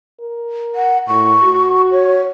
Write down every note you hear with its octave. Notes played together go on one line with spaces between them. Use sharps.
A#4
F#5
A2 C#6
F#4
C#5